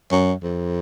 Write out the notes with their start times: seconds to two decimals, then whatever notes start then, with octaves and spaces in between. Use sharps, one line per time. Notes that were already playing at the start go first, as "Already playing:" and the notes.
0.11 F#2
0.43 F2